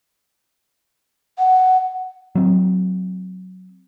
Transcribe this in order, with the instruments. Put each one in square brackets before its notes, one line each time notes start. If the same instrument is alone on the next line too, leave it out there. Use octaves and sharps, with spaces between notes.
[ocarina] F#5
[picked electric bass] F#3 C4